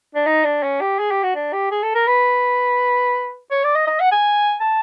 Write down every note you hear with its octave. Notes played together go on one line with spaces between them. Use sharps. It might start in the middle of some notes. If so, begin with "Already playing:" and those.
D4
D#4
D4
C#4
G4
G#4
G4
F#4
D4
G4
G#4
A4
A#4
B4
C#5
D5
D#5
D#5
F#5
G#5
A5